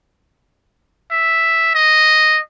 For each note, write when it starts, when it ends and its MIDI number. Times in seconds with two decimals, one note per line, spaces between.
1.11 1.72 76
1.75 2.40 75